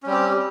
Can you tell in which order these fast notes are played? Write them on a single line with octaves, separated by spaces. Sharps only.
C#4 G3 C4 G4